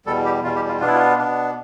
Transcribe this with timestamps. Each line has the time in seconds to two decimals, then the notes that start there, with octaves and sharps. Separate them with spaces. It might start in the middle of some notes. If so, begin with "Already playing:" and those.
0.06 E2 B2 G3 A4
0.25 G4
0.43 E2 B2 G3 F4
0.56 G4
0.68 F4
0.80 B2 B3 D4 F4
0.87 E4
0.95 F4
1.17 B2 B3 D4